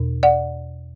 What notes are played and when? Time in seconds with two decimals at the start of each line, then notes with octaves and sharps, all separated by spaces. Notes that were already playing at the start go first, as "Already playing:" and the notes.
Already playing: E2 B2
0.23 D5 F#5